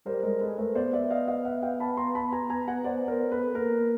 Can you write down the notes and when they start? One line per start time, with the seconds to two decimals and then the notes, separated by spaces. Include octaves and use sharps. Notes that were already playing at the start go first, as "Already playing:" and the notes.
0.05 G3 A#4 C5
0.23 G#3 A#4 C5
0.41 G#3 A4 B4
0.58 A3 A#4 C5
0.75 B3 C5 D5
0.93 D5 E5
1.11 D#5 F5
1.27 D#5 F5
1.45 E5 F#5
1.62 F5 G5
1.80 A5 B5
1.97 A#5 C6
2.15 A5 B5
2.32 G#5 A#5
2.50 G#5 A#5
2.68 F#5 G#5
2.84 C5 D5
3.08 A#4 C5
3.31 A4 B4
3.54 A#3 A#4